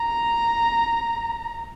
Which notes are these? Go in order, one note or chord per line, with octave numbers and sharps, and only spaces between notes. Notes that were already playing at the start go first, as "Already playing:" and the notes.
Already playing: A#5